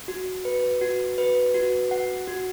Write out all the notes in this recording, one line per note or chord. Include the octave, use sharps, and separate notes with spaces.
F#4
B4
F#4
B4
F#4
F#5
F#4